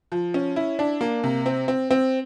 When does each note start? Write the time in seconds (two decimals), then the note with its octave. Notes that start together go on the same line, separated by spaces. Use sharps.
0.12 F3
0.34 C#4
0.56 E4
0.79 D4
1.01 A#3
1.24 C3
1.46 C4
1.68 C4
1.91 C4